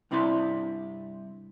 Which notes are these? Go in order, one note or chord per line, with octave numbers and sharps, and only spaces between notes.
G2 C3 C4 E4 D5 C6